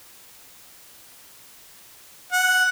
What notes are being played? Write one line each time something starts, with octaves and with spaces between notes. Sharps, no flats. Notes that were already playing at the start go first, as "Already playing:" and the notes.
F#5